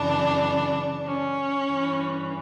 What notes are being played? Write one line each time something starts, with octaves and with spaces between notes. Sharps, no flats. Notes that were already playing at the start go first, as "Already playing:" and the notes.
Already playing: F#2 C#3 E3 D4
C#4
G2 E3